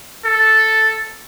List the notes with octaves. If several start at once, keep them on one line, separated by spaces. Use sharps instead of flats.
A4